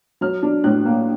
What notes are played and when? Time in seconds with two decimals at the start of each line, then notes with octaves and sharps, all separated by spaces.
0.21 F#3 F6
0.43 D4
0.64 A2 F#6
0.85 A#3